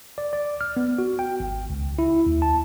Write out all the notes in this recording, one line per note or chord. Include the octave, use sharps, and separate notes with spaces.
D5
D5
F6
B3
F#4
G5
G#1
C#2
E4
D#2
A5